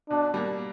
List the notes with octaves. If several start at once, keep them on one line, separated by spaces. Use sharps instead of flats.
B2 D4
G3 A#3 D4